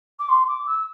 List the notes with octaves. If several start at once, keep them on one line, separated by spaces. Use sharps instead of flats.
D6
C6
D6
E6